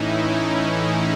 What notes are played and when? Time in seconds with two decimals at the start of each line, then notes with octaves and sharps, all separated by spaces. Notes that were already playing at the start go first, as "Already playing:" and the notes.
Already playing: A2 E3 C#4 D#4 E4
0.13 D#4
0.42 E4
0.72 G#4